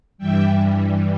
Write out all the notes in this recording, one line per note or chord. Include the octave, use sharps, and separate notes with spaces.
G2 E3 G3 E5 G5